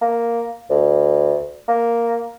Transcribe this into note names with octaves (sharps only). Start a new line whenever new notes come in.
A#3
D2
A#3